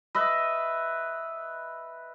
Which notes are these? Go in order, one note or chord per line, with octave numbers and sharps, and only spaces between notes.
B4 D#5 E5